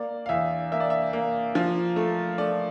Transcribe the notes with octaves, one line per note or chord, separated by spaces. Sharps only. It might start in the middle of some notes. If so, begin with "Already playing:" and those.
Already playing: A#3 D5
F5
E2 E5
A#3 E5
D5
E5
A#3
F3
A3
A3 D5